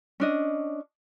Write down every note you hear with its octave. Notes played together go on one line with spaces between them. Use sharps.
C#4 D4 D#5